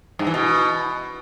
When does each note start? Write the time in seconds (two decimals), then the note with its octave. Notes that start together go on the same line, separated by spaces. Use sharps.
0.19 G2
0.27 E3
0.34 B2